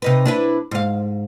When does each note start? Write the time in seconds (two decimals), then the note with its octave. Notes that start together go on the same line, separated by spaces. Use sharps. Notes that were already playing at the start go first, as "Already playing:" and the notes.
0.02 C3 D#4 B4
0.25 D4 E4 B4
0.71 G#2 F5